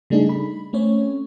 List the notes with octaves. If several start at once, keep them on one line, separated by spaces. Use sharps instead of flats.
C#3 G3 A3 D4 D#4 G#4
B5
A3 C4 C#4 C#5